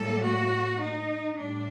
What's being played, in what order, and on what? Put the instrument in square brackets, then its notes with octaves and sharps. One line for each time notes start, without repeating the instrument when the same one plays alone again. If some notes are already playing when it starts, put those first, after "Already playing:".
Already playing: [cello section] A2 G3 A#3 A4
F#4
D#4
A2 G3 D4